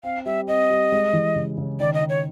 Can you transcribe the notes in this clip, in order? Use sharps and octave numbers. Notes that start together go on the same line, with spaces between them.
C4 F5
G3 E5
C4 D#5
G3
G#3
E3
C#3
C#3
D#3 D5
D#5
D#3
C#5